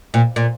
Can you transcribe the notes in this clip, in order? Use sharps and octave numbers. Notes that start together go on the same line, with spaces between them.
A#2
A#2